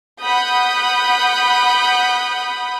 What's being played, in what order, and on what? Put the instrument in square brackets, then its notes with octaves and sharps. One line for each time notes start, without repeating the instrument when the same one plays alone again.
[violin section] F#5 B5 D#6 G6